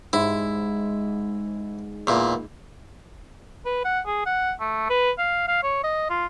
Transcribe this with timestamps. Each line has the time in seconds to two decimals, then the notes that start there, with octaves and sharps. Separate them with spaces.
0.13 G#2 E4
2.07 E2 A#2
3.66 B4
3.84 F#5
4.07 G#4
4.26 F#5
4.60 A3
4.90 B4
5.18 F5
5.48 F5
5.63 C#5
5.84 D#5
6.10 F4